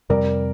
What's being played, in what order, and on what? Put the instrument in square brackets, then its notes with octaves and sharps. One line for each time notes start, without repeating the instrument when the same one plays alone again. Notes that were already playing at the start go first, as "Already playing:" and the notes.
[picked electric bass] F2 C3 G3 C4 [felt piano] A#4 D5